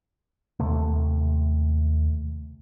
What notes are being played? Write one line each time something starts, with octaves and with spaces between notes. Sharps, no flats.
D#2 C3 A3